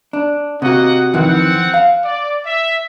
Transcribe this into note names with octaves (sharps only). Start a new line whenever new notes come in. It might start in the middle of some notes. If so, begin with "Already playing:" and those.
D4
C3 A#3 F#4 D#5 F#5
F2 D#3 E3 C4 F#5
F5
D5
E5